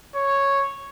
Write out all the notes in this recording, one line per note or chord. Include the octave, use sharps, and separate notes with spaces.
C#5